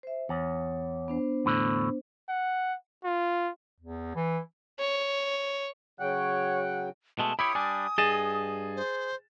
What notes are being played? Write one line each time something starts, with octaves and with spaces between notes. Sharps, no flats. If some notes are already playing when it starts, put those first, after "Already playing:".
C5 E5
E2 C#5
B3 D4 C5
E2 A2 D3
F#5
F4
E2
E3
C#5
C#3 F#3 C#5 F#5 G5
B2 G#3 A3 A5
E4 G4 C#5 B5 D#6
G3 D4 G#5
G2 G#4 D#5 A6 E7
C5